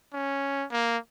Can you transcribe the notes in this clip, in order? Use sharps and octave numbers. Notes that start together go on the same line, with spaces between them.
C#4
A#3